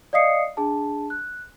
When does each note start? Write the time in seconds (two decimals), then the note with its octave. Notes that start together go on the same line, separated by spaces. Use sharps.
0.13 D5 D#5 F5 D#6 C7 C#7
0.57 D4 G#4 A5
1.10 F#6